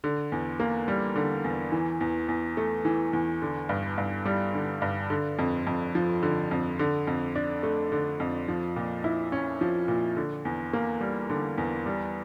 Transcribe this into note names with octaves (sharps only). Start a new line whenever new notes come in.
D3
E2
A#3
G3
D3
E2
E3
E2
E2
A3
E3
E2
D3
G2
G2
G3
D3
G2
D3
F2
F2
F3
D3
F2
D3
F2
D4
A3
D3
F2
F3
A#2
E4
C#4
F3
A#2
D3
E2
A#3
G3
D3
E2
G3